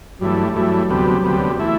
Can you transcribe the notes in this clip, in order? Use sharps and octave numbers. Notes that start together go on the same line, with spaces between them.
G2 E3 F#3 A3
G2 E3 F#3 A3
D2 C3 G3 B3
D2 C3 G3 B3
E3 A3 E4